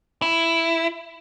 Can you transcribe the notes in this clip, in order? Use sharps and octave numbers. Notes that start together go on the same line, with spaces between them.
E4